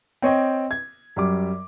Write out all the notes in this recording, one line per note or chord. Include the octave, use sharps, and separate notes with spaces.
C4 C#5 D#5 G5
G#6
F#2 G3 D6